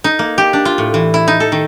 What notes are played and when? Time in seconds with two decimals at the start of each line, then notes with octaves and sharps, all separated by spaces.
0.04 D#4
0.19 A#3
0.38 G4
0.53 D4
0.65 F4
0.78 A2
0.94 E3
1.14 E4
1.28 D#4
1.40 A4
1.52 D#3